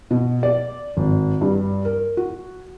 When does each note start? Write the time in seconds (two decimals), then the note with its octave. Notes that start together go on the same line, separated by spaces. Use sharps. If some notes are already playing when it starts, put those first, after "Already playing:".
0.11 B2
0.43 D5
0.97 G#1
1.41 G2
1.85 A#4
2.17 F#4